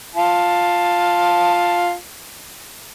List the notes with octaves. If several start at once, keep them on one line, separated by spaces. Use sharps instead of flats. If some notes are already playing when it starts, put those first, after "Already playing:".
F4 A5